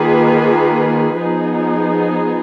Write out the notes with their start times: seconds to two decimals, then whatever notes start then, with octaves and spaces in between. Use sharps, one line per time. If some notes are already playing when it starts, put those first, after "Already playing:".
Already playing: D#3 A#3 F4 G#4 B4
1.16 F3 B3 D#4 G#4